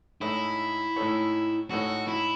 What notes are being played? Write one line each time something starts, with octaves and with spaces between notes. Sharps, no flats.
A2 G#3 D#4 E4 A4 C#5
A2 G#3 D#4 A4 C#5
A2 G#3 D#4 F#4 A4 C#5
E4